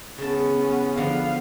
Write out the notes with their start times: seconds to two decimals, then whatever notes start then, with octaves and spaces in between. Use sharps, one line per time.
0.18 C#3 B3 C#4 A5
0.97 D3 F3 B3 F5